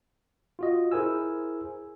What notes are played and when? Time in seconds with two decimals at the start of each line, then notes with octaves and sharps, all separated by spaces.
0.59 F4 F#4 D#5
0.92 E4 G#4 A#4 C5 G#5 E6